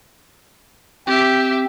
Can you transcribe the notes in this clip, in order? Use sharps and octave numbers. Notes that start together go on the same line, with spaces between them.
C4 G4 E5